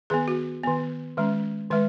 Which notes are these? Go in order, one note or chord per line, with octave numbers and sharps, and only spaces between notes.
D#3 B3 G#4
F#4
D#3 B3
D#3 G#3 C#4
D#3 G#3 B4